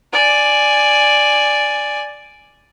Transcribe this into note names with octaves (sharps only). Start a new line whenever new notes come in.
D5 G#5